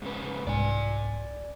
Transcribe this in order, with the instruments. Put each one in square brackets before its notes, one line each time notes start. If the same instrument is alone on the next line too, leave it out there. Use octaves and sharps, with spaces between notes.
[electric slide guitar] G#2 C#3 B4
[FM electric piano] C2 G#2 [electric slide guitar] D5 G#5